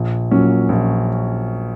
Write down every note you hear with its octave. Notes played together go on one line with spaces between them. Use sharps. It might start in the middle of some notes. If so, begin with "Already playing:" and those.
Already playing: A#1
A#2 F#3 C#4
A#1